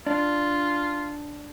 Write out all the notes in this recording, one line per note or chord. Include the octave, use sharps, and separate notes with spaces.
D4 F4